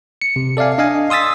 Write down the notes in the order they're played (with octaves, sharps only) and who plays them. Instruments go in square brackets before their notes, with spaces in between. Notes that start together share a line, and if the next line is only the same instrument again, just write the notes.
[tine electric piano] C#7
C3
A4 D5 E5 F5 G#5
D4 D#5 F5 G#5
C6 D#6 E6 A6 B6